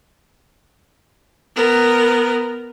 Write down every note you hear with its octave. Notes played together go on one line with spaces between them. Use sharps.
B3 A#4